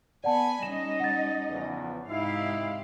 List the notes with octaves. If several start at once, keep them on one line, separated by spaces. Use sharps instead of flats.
B3 D5 F#5 G#5 A5 B5
G3 C#4 D#4 D#5 E7
F#5 A6
E2 C#3 F3
G#2 C3 D#4 E4 G4 E5 F5